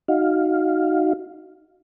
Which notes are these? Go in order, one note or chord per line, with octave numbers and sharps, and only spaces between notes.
D#4 F#4 F5